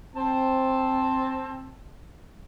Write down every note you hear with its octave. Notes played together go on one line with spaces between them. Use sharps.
C4 A5